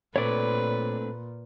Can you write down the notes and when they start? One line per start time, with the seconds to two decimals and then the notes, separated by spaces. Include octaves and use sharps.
0.16 A#2 A3 C4 D4 B4 C#5 D5